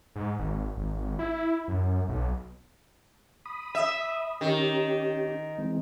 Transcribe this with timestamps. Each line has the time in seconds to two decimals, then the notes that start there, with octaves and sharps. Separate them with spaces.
0.16 G#2
0.39 G#1
0.77 G#1
1.19 E4
1.68 F#2
2.09 B1
3.45 B5 D#6
3.75 E5
4.41 D#3 C#4 G4
5.58 E3 G#3 C4